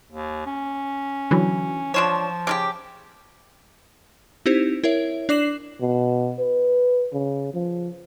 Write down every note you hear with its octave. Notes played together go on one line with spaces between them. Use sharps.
D#2
C#4
D3 E3 F#3
F3 D4 F4 C#5 E7
C#3 F4 G4 D6
C4 D#4 E4 G4 C5
E4 A#4 C#5 E5
D4 D5 D6 C7 E7 F#7
B2
B4
C#3
F3